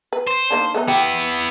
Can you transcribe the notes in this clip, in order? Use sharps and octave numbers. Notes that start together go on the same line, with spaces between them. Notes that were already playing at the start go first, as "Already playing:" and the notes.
B4
C5
D#3 A#3 D4
A3 B3 D#4
B3 E4 G4